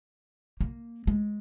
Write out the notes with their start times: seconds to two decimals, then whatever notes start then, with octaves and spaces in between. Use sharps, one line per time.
0.61 A#3
1.07 G#3